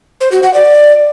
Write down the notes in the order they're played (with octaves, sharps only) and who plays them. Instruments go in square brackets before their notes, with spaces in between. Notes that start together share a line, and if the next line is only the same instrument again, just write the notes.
[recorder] C5
F#4
F#5
D5